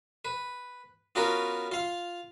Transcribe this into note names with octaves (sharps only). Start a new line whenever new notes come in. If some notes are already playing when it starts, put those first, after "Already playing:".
B4
B3 C#4 F4 F#4 A#4 B4
F4 F5